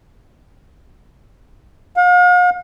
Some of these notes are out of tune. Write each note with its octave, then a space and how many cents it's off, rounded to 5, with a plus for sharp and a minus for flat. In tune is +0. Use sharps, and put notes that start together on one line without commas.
F5 +45